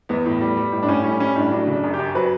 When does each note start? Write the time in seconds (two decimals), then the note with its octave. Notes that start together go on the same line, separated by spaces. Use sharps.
0.09 E2 B3
0.26 A2
0.41 G3
0.57 G3
0.72 A2
0.83 D4
0.88 A2 C#4
1.04 G3 C#4
1.20 G3 C#4
1.36 A2 D4
1.52 F#3 D4
1.67 C#3
1.72 D4
1.83 F#2
1.94 G4
1.99 F#2
2.15 F#3 B4